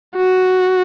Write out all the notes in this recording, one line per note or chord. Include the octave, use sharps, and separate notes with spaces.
F#4